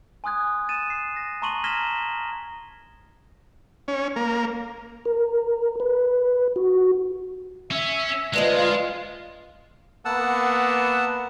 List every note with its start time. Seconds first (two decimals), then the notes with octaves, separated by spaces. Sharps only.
0.24 G#5 C6 D#6 F#6 G#6
0.69 A6 D#7 E7
0.90 C7
1.16 A#6
1.42 A5 A#5 C6 C#6 D#7 F#7
1.64 F6 G#6 A#6 B6 E7 G7
3.88 C#4
4.16 A#3
5.05 A#4
5.80 B4
6.56 F#4
7.71 C#4 E5
8.34 D2 G#3 F4 B4 D#5
10.05 A#3 B3 F#5 A5 E6